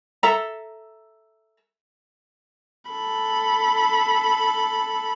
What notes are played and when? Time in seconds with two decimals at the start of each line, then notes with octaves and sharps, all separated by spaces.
0.23 A4 E5 A#5
2.91 A4 B5